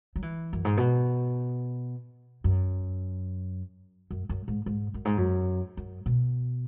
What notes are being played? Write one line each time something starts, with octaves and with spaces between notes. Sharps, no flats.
F#3
E3
F#2
G#2
B2
F#2
F#2
F#2
G#2
G#2
F#2
G#2
F#2
F#2
B2